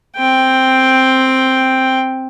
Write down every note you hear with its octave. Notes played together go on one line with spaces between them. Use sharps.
C4 G5